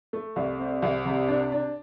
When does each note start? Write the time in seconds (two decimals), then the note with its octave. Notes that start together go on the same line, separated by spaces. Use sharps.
0.13 A3
0.36 C2
0.59 C4
0.82 C2
1.05 C3
1.28 D4
1.52 D4